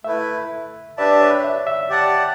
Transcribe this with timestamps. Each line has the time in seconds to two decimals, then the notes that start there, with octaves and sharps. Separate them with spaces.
0.04 A3 E4 B4 E5
0.97 D4 G4 B4 D5 E5 A5
1.21 C#5
1.44 E5
1.67 E5
1.90 G4 D5 F#5 A5